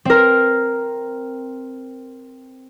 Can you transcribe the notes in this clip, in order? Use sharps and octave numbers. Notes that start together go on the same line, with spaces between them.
C4 A#4